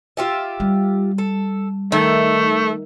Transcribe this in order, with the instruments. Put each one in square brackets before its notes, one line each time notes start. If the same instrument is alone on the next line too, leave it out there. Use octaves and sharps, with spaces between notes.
[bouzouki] F4 G4 E5
[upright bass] G3
[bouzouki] A4
[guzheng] D#3 [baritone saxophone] A3 [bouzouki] E5